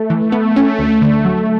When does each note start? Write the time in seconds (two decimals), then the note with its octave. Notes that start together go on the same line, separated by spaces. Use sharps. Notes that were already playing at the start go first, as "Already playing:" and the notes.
Already playing: A3
0.10 E3
0.32 B3
0.56 C#4
0.79 D2
1.02 D3
1.25 F#3